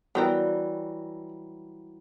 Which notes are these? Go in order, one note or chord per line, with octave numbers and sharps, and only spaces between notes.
E3 F#3 G3 B3 G4 A#4